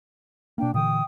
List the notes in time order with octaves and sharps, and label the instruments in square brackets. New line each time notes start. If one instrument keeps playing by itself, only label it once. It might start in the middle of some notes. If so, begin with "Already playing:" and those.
[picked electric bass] B2 A#3 [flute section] D4 G5
[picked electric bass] A#2 D3 E3 [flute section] G5 D#6